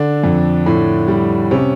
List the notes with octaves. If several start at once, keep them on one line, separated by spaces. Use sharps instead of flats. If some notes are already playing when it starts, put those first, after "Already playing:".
Already playing: D3 D4
F2
A2
G3
C3 C#4